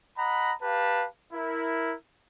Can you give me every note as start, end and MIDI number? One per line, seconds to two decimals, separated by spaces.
0.18 0.53 75
0.18 0.53 78
0.18 0.53 82
0.18 0.53 83
0.62 1.06 67
0.62 1.06 71
0.62 1.06 77
0.62 1.06 81
1.33 1.94 64
1.33 1.94 70